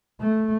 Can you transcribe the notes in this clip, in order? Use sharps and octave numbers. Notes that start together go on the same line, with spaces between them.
A3